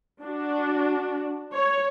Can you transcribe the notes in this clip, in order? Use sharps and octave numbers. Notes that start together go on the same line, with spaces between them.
D4 F#4
C#5